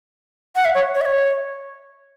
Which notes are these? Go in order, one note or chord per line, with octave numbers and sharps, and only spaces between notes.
F#5
E5
C#5
C#5
E5
C#5